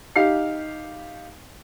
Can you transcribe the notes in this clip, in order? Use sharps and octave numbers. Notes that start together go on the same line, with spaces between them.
D#4 G4 F5 C7